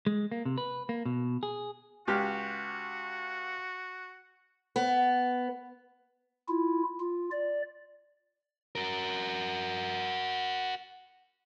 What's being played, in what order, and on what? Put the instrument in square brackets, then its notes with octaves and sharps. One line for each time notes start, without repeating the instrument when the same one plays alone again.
[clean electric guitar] G#3
A#3
C3
B4
A#3
B2
G#4
[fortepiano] C#2 G4 F6 [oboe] F#4
[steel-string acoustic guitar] B3
[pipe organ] E4 F4
F4
D5
[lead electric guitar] F#4 A#4